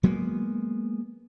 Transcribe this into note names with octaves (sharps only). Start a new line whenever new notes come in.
F#3 G#3 A#3 B3